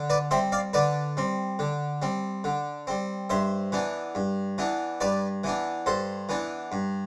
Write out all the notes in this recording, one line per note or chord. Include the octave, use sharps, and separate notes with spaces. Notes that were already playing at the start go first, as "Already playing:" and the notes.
Already playing: D3
B4 D5
G3 C4 C5 E5
D5 F5
D3 B4 D5
G3 C4
D3
G3 C4
D3
G3 C4
G2 C5 E5
E3 B3 D4
G2
E3 B3 D4
G2 B4 D5
E3 B3 D4
G2 A4 C5
E3 B3 D4
G2